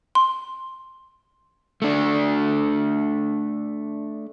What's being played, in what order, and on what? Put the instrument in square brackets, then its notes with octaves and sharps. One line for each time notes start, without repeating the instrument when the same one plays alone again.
[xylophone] C6
[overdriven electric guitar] A3 D4